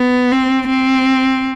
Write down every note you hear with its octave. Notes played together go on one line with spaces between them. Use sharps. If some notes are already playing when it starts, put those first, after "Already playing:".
Already playing: B3
C4
C4